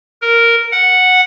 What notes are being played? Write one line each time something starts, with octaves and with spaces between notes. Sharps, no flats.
A#4
F#5